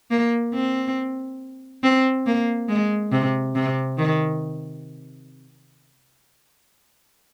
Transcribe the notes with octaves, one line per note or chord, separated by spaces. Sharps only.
A#3
C4
C4
A#3
G#3
C3
C3
D#3